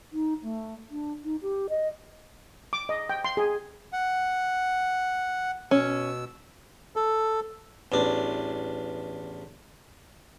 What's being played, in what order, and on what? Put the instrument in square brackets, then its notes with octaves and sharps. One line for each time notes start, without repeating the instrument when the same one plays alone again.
[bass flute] D#4
A3
D4
D#4
G4
D#5
[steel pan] D6
D#5
G5
C6
G#4
[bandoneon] F#5
[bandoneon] B2 E6 [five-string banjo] C#4
[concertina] A4
[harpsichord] A1 E2 D4